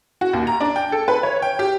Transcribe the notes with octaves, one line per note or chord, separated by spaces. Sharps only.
F#4
D#2
A#5
D4
G5
A4
B4
C#5
G5
G4